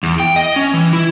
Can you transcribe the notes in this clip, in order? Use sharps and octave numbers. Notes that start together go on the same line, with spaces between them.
E2
G5
D#5
C#4
E3
E4